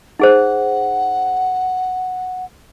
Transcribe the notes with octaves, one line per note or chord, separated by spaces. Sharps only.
D#4 G#4 C5 F#5